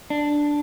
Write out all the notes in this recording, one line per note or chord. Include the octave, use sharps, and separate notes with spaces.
D4